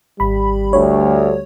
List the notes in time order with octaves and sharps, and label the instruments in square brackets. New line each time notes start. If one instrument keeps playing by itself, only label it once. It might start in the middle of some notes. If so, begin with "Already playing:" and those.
[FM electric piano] G#1 B5 [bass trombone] G3
[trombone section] D2 [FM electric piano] C#5